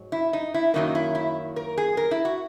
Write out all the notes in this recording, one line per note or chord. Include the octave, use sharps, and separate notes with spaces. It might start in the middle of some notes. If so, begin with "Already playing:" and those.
Already playing: G#2 F#3
E4
D#4
E4
F#2 D#3 F#3 A#3 D#4
E4
E4
A#4
G#4
A#4
E4
F#4